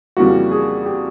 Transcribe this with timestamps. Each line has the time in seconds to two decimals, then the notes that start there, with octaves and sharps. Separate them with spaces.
0.17 F2 C#3 E3 G3 A#3 F#4
0.51 G#4
0.86 G4